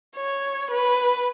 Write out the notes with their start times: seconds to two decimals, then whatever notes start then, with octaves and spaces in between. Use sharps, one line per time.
0.16 C#5
0.71 B4